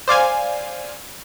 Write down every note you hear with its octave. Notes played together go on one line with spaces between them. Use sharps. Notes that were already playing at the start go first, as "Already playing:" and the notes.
C5 D5 F5 G#5